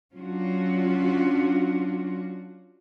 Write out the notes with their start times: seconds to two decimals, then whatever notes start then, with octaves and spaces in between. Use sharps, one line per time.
0.14 F#3 C#4 D4 F4 F#4